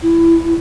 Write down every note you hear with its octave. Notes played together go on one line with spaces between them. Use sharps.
E4